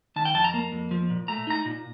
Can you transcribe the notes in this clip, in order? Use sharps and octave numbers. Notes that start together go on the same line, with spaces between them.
D#3 A5
G5
F2 A5
A#5
A#3
F2
F3
A#2
A3 A#5
D#4 A#5
A#2